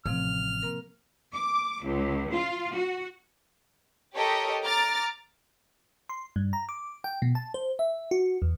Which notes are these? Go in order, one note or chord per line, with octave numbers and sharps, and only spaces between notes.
A1 C3 F3 C4 F6
A#3 C4 A#4
D6
C#2
F4
F#4
G4 A4 A#4 C#5 D#5
A#5 D6 F6 A6
C6
G2
A#5
D6
G5
B2
A5
C5
E5
F#4
E2